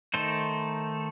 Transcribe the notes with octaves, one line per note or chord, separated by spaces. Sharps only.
D#3 A3 D#4 A4 C5